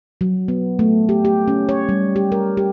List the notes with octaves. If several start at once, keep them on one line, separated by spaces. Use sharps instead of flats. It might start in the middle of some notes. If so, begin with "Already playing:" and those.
F#3
B3
A3
G4
G4
C#4
C#5
G3
G4
A#4
G4